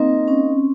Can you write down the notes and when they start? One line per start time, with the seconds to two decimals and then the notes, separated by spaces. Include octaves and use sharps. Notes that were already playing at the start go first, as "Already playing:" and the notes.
Already playing: A#3 C4 D#4 A#4 D#5
0.28 C#4